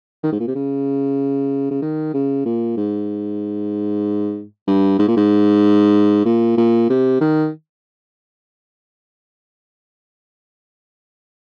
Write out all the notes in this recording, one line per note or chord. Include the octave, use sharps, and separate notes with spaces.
D#3
G#2
A#2
C3
C#3
C#3
D#3
C#3
A#2
G#2
G2
G#2
A#2
G#2
A#2
A#2
C3
D#3